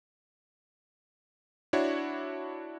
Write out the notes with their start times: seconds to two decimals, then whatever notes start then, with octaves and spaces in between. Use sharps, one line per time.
1.73 D4 E4 F#4 C#5